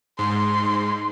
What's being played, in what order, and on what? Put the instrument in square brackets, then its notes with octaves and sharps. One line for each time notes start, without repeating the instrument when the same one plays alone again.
[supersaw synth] G#2 [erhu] C6